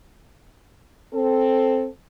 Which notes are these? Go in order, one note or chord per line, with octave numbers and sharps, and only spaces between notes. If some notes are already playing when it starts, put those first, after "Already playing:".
C4 A4